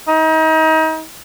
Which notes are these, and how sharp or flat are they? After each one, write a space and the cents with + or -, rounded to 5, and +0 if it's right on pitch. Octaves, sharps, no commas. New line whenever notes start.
D#4 +35